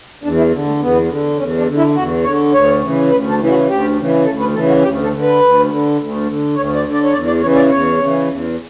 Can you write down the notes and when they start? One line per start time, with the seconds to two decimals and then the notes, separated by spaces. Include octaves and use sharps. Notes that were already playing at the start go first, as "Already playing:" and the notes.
0.24 E2 D4
0.38 E4
0.52 D3
0.67 A3
0.80 E2 B3
1.09 D3
1.38 E2 C#4
1.58 D4
1.67 D3
1.77 E4
1.95 E2 F#4
2.24 D3 C#5
2.53 D2 C#5
2.82 C#3 E3
3.10 D2 B4
3.29 A4
3.39 C#3 E3
3.44 E4
3.49 F#4
3.69 D2 G4
3.97 C#3 E3
4.25 D2 A4
4.40 B4
4.54 C#3 E3 A4
4.68 F#4
4.83 D2 G4
5.02 A4
5.11 D3
5.22 B4
5.41 D2
5.69 D3
5.98 D2
6.26 D3
6.55 D2 C#5
6.75 D5
6.85 D3
6.93 D5
7.04 C#5
7.13 E2 D5
7.27 D5
7.42 C#3 E3 C#5
7.56 D5
7.70 E2 C#5
7.99 C#3 E3
8.27 E2